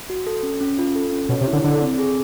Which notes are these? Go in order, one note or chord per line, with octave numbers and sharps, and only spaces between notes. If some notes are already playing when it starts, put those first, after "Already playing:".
F#4
A4
C#4
C#4
F4
A4
C#4
B2 C#5
C3
E4
D3
D3 A4
C4
G#4